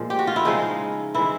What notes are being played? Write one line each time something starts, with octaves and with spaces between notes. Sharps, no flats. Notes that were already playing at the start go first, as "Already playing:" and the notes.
Already playing: A#2 F3 G#3
G4
F#4
F4
E4
C#3 F3 G#3 D#4
E3 G#3 E4